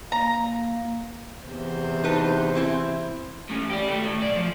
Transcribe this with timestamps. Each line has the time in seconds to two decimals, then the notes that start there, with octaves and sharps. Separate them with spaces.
0.12 A#3 A#5
1.45 E2 C3 C5
2.04 D#4 B4 A5
2.55 E3 C4 E4
3.49 A2 C#4
3.70 G4 D5
3.87 D#2 A3
4.05 A2
4.23 B1 D5
4.36 F3